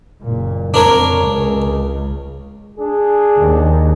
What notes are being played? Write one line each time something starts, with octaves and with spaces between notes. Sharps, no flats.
F#1 A#2
F2 D4 A#4 C#5
C#2 C#3
D4 G#4
D#2